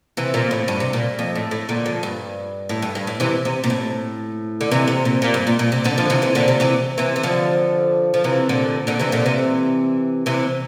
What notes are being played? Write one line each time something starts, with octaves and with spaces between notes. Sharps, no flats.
C3 E3
A#2
A2
G2
C3
A#2
F2
A2
A2
A#2 D3
F2
G2
A2
G2
G2
A2
C3 E3
C3
A#2
A2
D3
C3 E3
C3
A#2
A#2
G2
A#2
A#2
C3
A#2 D3
D3 F3
C3 E3
C3 E3
A#2 D3
C3
C3 E3
C3 E3
E3
D3 F3
F3
C3 E3
A#2 D3
A#2 D3
C3 E3
A#2 D3
C3 E3
C3 E3